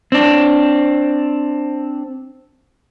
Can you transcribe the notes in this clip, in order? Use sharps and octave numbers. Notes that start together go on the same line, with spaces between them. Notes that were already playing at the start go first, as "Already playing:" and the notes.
C4 D4